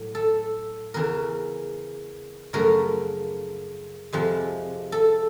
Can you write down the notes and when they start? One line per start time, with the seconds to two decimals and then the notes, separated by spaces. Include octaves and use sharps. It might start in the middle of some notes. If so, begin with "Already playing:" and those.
Already playing: A2 F#3
0.15 A4
0.94 E2 C#3 E3 A#4
2.53 F#2 C#3 F3 A3 A#4
4.13 F2 C3 F3 G#3
4.92 A4